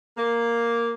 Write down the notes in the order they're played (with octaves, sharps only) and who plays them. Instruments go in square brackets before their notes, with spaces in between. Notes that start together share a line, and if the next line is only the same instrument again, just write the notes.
[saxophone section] A#3